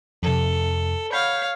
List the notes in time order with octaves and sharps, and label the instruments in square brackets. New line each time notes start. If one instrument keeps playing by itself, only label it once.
[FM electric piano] F2 C3 [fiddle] A4
[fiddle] C#5 F5 [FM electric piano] F#5 B5 G6